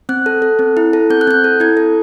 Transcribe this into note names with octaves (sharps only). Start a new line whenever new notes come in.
C4 F#6
A4
A4
C4
E4
A4
C4 G6
F#6
C4 G6
A4
E4 G#6
A4